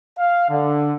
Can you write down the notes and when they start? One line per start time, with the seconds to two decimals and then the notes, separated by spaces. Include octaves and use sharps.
0.18 F5
0.49 D3